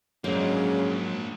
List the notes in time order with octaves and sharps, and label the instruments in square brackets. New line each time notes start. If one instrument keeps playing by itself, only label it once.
[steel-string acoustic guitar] G#2 [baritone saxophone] C#3 [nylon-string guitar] F#3 [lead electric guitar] A#3 D4